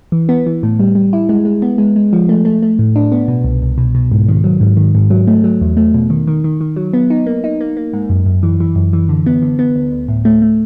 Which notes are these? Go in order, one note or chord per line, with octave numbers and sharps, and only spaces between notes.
E3
B3
E3
A2
G3
G3
E4
G#3
G#3
B3
G#3
G#3
F3
A3
A3
A3
A2
D4
B3
B2
C2
C2
B2
B2
G#2
D#3
F#3
G#2
D#3
G#2
F#3
A3
F#3
E2
A3
B2
D#3
D#3
D#3
D#3
F#3
B3
D#4
A#3
D#4
A#3
A#3
G#2
F#2
F#2
E3
E3
F#2
E3
D3
B3
D3
B3
D2
D2
A2
A3
A3